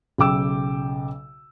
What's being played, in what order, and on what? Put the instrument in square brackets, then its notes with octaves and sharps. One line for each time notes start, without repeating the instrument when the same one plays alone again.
[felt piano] B1 C#3 G5 D6 E6